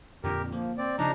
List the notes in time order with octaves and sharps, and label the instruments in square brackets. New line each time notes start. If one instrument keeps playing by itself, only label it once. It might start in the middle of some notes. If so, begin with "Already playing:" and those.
[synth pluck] F2 A#2 D3 [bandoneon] G4 A#4
[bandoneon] F3 [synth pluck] A#3
[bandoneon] C4 D5
[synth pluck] C#3 F3 [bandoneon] D4 D#4 A#5